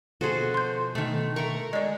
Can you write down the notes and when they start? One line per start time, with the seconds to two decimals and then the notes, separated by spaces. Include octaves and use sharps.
0.21 B2 F3 F#4 G#4 A4 C5
0.54 C6 G6
0.95 B2 D#3 A3
1.36 A3 A#4 C#6
1.73 G#3 G#4 D5 D#5